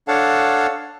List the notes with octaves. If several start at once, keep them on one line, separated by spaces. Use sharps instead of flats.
D4 A4 C#5 F5 F#5 A5